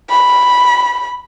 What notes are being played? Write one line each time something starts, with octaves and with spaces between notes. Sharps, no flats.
B5